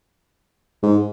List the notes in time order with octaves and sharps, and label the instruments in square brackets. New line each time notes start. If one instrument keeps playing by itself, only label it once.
[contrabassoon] G#2